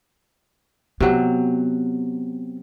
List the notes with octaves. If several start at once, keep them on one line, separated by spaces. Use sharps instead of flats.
C3 F#3 B3